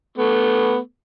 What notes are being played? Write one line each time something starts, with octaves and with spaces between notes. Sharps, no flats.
A3 B3